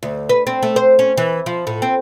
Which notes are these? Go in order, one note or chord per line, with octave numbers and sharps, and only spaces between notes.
D2
B4
C4
A3
C5
C#4
E3
F3
A2
C4